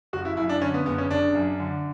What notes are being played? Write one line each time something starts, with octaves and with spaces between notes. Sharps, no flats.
F#1 F#4
E4
F#2 E4
D4
D3 C#4
B3
F#1 B3
C#4
F#1 D4
F#2
D3